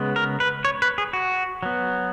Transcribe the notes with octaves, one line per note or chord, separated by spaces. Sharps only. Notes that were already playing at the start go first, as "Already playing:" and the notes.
Already playing: C#3 G#3 B3
A#4
B4
C#5
B4
G#4
F#4
F#3 B3